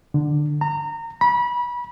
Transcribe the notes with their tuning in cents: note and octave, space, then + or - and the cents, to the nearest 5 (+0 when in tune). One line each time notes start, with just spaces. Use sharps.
D3 +15
A#5 -25
B5 -30